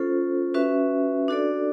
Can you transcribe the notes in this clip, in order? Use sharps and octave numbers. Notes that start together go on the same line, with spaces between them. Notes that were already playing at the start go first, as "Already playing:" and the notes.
Already playing: C#4 F4 A4 C5
C#4 F#4 B4 E5
D4 F#4 A4 D5